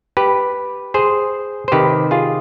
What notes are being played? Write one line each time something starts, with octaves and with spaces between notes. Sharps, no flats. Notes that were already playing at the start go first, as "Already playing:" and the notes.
G4 B4
G#4 C5
C5
C3 D#3 G4 B4
F4 G#4